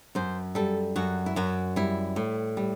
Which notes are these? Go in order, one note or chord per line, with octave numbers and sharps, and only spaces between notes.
F#2 C5
G3 A4
F#2 F#4
E4
F#2 F#4
G3 E4
A2
G3